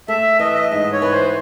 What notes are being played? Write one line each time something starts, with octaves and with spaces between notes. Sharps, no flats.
A3 E5
E3 D#5
E5
D#5
G#2 D#5
C#5
E3 B4
C5